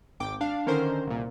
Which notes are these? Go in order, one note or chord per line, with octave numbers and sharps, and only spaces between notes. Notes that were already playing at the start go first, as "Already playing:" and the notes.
G#1 G5 D6
D4 F5
D3 D#3 C#4 A#4 C5
C2 A#2